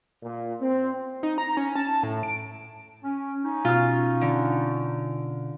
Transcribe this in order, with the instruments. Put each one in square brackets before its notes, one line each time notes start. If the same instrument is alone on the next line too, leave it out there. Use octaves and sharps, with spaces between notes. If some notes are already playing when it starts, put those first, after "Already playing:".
[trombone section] A#2
C4
[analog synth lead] D#4
A#5
C#4
A5
A2
D7
[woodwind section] C#4
C#4 D#4
[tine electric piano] B2 [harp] F4 F6
[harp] D3